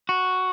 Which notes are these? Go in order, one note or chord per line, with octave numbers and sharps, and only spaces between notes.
F#4